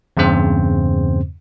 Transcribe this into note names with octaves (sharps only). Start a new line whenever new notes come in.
E2 G2 C#3 C4 C5